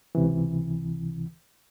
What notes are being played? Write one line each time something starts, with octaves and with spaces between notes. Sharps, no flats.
C#2 C3 E3